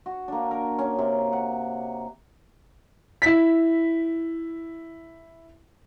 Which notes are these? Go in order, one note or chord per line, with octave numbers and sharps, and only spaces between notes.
F#4
A#3 D4
A#4
C#4
C3
F#5
E4 B6